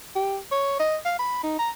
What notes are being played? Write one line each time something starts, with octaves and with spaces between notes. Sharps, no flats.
G4
C#5
D#5
F5
B5
D#4
A#5